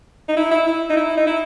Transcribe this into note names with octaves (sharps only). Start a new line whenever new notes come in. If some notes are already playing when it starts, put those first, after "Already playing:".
D#4
E4
E4
E4
D#4
E4
D#4
E4